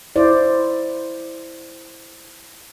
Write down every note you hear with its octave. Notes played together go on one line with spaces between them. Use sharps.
E4 C5 D5